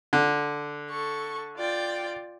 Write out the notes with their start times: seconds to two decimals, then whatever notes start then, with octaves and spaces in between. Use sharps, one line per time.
0.13 D3
0.89 A4 C#6
1.57 F4 D5 G5